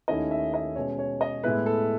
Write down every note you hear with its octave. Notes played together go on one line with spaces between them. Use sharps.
D#2 D#3 A3 C#4 E4 D#5
E5
D#5
B2 G#3 C#4 C#5
C#5
D#5
A2 G#3 B3 E4 B4
A4